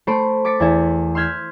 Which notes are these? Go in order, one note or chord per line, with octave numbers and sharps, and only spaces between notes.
A3 C5 B5 D7
D6 A6 B6 C#7 D7
E2 E4
C6 E6 F6 G6 G#6 B6